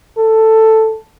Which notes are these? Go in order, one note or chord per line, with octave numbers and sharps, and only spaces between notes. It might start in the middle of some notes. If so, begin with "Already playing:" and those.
A4